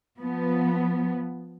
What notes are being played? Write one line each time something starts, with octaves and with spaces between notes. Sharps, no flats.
F3 B3